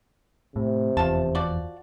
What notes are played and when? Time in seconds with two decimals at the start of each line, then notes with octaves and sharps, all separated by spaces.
0.56 A2 C3
0.97 F1 E2 F4 A5
1.35 F3 F#4 D5